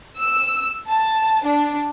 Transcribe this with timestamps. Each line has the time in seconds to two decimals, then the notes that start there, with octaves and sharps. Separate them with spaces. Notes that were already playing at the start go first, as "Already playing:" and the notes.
0.20 E6
0.88 A5
1.45 D4